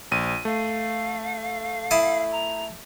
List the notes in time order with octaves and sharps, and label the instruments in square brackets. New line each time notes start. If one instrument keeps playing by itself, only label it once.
[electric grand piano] A#1 D#7
[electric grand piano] A3 [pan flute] F5
[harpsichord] E4 A5 D#6
[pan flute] A#5